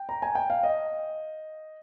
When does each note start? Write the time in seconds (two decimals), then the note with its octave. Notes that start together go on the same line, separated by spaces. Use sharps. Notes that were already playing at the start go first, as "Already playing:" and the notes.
Already playing: G5
0.09 A#5
0.22 G#5
0.35 G5
0.50 F5
0.63 D#5